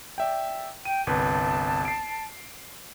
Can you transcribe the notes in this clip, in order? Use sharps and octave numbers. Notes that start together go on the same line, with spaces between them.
D5 E5 G5
G5 D#7
G1 C2 B4 A5
C7 D7